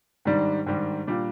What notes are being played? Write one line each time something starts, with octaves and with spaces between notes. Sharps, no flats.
G#2 D#3 G3 D4
G#2 D#3 G3 D4
A#2 G3 D4